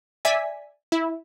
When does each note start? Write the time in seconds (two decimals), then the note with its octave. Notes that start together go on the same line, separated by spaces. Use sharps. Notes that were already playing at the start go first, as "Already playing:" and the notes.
0.25 D5 E5 G#5 B6
0.92 E4